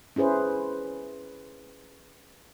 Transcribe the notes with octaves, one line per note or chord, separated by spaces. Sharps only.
C#4 E4 G#4 B4 C5